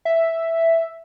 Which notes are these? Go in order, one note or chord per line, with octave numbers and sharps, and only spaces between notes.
E5